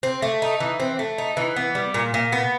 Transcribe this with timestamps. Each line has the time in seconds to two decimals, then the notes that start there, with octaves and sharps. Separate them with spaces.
0.03 C4
0.22 A3
0.42 D#4
0.60 E3
0.80 C4
0.99 A3
1.18 D#4
1.37 E3
1.56 B3
1.75 G3
1.94 A#2
2.14 A#2
2.32 B3